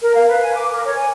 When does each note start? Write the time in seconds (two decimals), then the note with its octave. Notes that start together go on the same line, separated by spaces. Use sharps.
0.02 A#4
0.15 F5
0.28 B4
0.42 G#5
0.54 D6
0.71 A#4
0.85 C#5
0.97 G#5